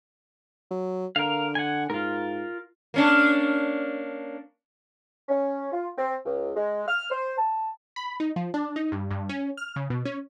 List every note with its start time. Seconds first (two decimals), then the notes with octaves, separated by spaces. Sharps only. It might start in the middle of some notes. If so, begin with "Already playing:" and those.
0.71 F#3
1.16 D3 A#4 F5
1.55 F#5 G#5
1.90 G#2 F4 A#4
2.94 A#3 C#4 D4
5.29 C#4
5.72 F4
5.98 C4
6.25 C#2
6.55 G#3
6.87 F6
7.10 C5
7.37 A5
7.96 B5
8.20 D#4
8.36 F3
8.54 D4
8.76 D#4
8.92 G2
9.11 G2
9.29 C#4
9.57 F6
9.76 C#3
9.90 B2
10.05 C#4